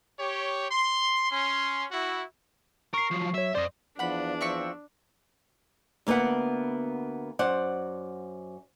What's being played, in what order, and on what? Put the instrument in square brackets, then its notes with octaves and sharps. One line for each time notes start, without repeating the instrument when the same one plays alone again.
[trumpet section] G4 C#5
C6
C#4 C6
E4 F#4
[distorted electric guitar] A#4 [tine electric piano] C#6 C7
[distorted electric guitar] F3 F#3
[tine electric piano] F#3 C#5 [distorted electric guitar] E5
[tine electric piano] F2 D5 [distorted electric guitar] C5 D#5
[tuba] E2 [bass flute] F3 [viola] D4 [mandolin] F#5 B5
[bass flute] F3 [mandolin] C4 E5 C#6
[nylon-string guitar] D2 A#3 B3 B4 F#5
F#2 C5 D5 F#5